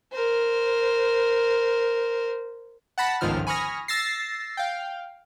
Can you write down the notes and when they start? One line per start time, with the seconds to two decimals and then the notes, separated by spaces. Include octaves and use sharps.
0.13 A#4 C5
2.98 F#5 A5 B5 A#6
3.21 G1 C#2 G#2 D#3 F3 F6
3.47 G#5 B5 C#6 D#6 F6 A#6
3.88 E6 A6 A#6 C7
4.57 F5 G5